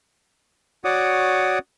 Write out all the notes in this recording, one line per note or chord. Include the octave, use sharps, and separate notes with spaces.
F#4 C#5 D5 F#5 D6 D#6